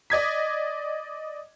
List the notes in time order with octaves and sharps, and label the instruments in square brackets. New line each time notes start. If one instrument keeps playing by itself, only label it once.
[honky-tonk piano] D5 D#5 G#6 B6